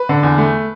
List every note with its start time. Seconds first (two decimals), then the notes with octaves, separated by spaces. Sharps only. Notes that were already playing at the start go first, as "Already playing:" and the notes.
Already playing: B4
0.09 D3
0.23 E2
0.38 A3